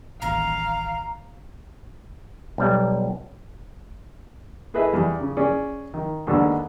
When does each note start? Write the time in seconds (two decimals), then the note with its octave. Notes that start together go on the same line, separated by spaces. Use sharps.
0.22 D#1 A1 D#2 F5 A#5
2.58 B1 G3
4.74 E4 G#4 A4 B4 D#5 E5
4.93 E2 G3
5.19 C#3
5.37 C#4 G#4 D5
5.94 D#3
6.27 D#2 G#2 D3 B3 D4 A4